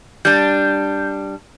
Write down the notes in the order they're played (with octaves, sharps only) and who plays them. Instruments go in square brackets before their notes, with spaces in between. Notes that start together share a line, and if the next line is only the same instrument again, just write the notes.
[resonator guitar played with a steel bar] G3 D4 [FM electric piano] G6